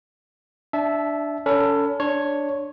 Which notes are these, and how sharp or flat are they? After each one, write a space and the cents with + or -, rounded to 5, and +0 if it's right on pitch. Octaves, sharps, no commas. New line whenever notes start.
D4 +0 E5 +0 A5 -25
C#4 +35 A4 +25 B5 +0
D4 +0 C#5 +0 C6 +40